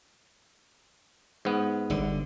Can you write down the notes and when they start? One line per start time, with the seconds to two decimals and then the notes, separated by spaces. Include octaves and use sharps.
1.45 G#2 B3
1.90 G1 D3